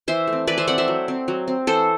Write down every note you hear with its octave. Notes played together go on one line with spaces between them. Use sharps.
E3 C5 E5
A3
C4
E3 B4 D5
C5 E5
A3 C4 D5 F#5
C5 E5
F#3
C4
F#3
C4
E3 A4 C5